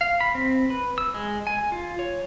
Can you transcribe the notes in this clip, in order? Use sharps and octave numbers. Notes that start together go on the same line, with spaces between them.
F5
B5
C4
B4
E6
G#3
G#5
F4
C#5